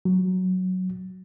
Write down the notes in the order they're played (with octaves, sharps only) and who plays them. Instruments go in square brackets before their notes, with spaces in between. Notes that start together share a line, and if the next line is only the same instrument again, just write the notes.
[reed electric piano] F#3